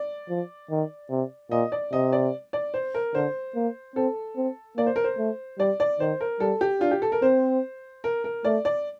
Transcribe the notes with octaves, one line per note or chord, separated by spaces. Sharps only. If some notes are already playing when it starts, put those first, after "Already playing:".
Already playing: D5
F3
D#3
C3
A#2 D#5
D5
C3 D#5
D5
D5
C5
A#4
D3 C5
A#3
C4 A4
C4
A#3 D5
C5
A#4
C5
A3
G3 D5
D5
D#3 C5
A#4
G3 A4
G4
D4 F4
G4
A4
A#4
C4 C5
A#4
A#4
A3 D5
D5